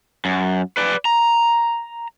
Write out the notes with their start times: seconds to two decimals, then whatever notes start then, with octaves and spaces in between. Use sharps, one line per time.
0.25 F#2
0.77 B4 D5
1.05 A#5